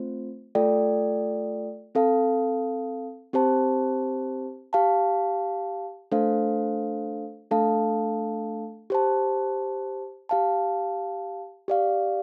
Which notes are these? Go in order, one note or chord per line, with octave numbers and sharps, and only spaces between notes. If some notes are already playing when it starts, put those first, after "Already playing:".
Already playing: A3 C4 F4 C5
A3 F4 A4 D5 G5
C4 A4 F5 A5
C4 G4 C5 A5
G4 F5 A5
A3 D4 A4 C5 F5
A3 D4 A4 F5 A5
G4 C5 A5
G4 F5 A5
G4 D5 F5